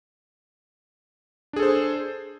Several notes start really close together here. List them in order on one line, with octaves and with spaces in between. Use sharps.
D4 G#4 A4 C5